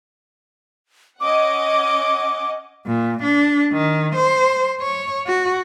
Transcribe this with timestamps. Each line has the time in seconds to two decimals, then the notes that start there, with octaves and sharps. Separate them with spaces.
1.21 C#4 D#5 F#5 D6
2.87 A#2
3.23 D4
3.72 D#3
4.16 C5
4.81 C#5
5.27 F#4